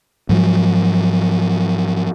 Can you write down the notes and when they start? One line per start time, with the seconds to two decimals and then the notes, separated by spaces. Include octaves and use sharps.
0.29 G#2 F3 F#3